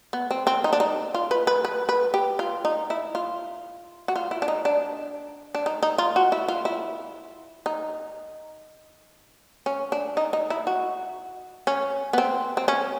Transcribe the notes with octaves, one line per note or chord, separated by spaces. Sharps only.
B3
C4
C4
D#4
D4
D#4
F4
B4
B4
B4
B4
G4
F4
D#4
E4
F4
F#4
F4
E4
D4
D#4
D4
D4
D#4
D#4
F4
F#4
E4
F4
E4
D#4
C#4
D4
D#4
D#4
E4
F#4
C#4
B3
C4
C4
C#4